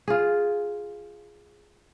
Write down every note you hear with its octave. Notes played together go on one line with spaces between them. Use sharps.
F4 G#4